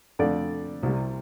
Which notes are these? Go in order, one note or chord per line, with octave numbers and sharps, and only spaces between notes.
F2 D3 A3 D5
C2 C3 G3